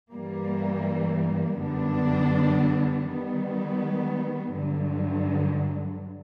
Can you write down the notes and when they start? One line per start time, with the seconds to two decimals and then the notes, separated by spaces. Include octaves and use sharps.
0.11 G2 E3 G3 A#3
1.57 F#2 D3 G3 B3 D4
3.06 D#3 G3 B3
4.52 G2 D3 F#3